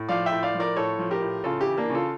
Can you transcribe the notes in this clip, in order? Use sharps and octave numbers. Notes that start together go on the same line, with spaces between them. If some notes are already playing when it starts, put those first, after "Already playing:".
Already playing: A2
F3 D5 F5
E5 G5
A2
D5 F5
F3
A#4 D5
A2 A4 C#5
F3
G4 A#4
A2
C#3 F4 A4
E4 G4
E3
A#3 D4
C#3
F4 A4